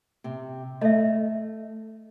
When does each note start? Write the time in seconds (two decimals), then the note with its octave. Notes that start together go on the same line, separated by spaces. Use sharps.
0.24 C3
0.81 A3 D#5 E5